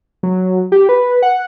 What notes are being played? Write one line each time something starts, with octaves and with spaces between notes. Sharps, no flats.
F#3
G4
B4
F#5